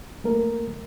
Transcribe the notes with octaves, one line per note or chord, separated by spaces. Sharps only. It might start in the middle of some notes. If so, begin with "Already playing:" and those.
A3 A#3 A#4